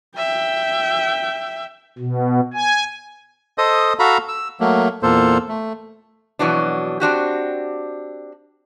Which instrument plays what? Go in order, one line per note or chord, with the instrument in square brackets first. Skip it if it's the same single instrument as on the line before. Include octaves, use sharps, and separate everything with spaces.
[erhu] E5 [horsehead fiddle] G5
[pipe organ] B2
G#5
[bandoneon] A4 C5 D#5 D#6
F#4 A4 F5 A#5 B5
E6
F#3 A3 A#3
E2 A#2 A#3 A4 C5
A3
[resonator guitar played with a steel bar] F2 B2 E3 F#3 D4
C4 D4 F#4 G4